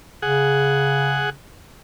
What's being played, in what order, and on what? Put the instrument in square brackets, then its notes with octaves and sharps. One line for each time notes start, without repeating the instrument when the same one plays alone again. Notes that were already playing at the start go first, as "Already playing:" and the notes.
[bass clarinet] C#3 [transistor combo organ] G#4 F#5